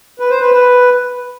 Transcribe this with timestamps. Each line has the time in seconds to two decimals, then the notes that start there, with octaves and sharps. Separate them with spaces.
0.20 B4
0.30 C5
0.41 B4
0.52 B4